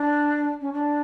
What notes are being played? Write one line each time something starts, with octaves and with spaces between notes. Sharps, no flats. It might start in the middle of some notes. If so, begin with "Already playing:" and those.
Already playing: D4
C#4
D4